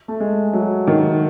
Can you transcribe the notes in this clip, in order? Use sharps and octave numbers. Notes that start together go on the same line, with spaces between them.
A3
G#3
F#3
D#3